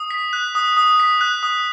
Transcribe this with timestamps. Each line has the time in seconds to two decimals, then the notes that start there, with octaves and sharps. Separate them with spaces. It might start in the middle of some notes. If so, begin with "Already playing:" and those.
Already playing: D#6
0.11 B6
0.33 F#6
0.55 D#6
0.77 D#6
1.00 B6
1.21 F#6
1.43 D#6